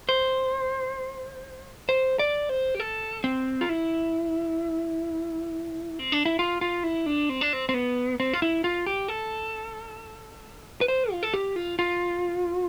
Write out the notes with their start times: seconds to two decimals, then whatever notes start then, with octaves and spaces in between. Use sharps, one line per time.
0.09 C5
1.89 C5
2.19 D5
2.49 C5
2.75 G4
2.80 A4
3.24 C4
3.61 F4
3.69 E4
5.99 C4
6.12 D4
6.25 E4
6.39 F4
6.61 F4
6.84 E4
7.06 D4
7.29 C4
7.41 D4
7.53 C4
7.69 C4
7.74 B3
8.20 C4
8.33 F4
8.42 E4
8.64 F4
8.86 G4
9.08 A4
10.81 B4
10.88 C5
11.12 F4
11.23 A4
11.34 G4
11.56 F4
11.79 F4